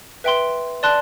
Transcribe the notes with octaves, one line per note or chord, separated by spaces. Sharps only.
B4 E5 G5 C6
D5 A5 C6 F#6